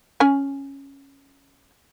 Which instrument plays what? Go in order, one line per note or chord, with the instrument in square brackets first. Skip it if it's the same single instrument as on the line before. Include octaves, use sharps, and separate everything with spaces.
[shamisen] C#4 G#5